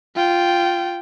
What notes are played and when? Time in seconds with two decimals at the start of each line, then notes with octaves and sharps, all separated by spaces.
0.16 F4 G5